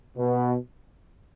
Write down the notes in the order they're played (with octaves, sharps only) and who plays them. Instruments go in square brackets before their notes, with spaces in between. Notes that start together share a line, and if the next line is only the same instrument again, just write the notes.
[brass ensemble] B2